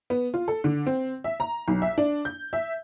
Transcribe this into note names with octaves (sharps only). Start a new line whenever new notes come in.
B3
F4
A4
D3
C4
E5
A#5
B1
E5
D4
G6
E5